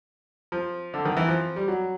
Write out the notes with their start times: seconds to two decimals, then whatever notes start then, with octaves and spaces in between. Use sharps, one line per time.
0.52 F3
0.94 D3
1.05 D#3
1.17 E3
1.28 F3
1.56 G3
1.68 F#3